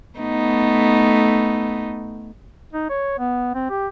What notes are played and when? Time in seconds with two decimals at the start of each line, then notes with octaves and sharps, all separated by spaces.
0.19 A3 B3 D#4
2.73 D#4
2.90 C#5
3.19 B3
3.55 C4
3.70 G4